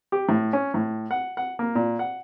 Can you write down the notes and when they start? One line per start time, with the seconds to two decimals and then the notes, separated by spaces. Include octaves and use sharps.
0.12 G4
0.29 A2
0.53 C#4
0.74 A2
1.11 F#5
1.37 F#5
1.59 A#3
1.75 A#2
1.99 F#5